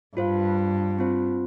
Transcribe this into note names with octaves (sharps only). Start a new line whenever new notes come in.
G2 F4 C5 F5
C4 F4 C5